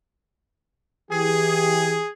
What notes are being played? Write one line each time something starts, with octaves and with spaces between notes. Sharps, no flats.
E3 G4 G#4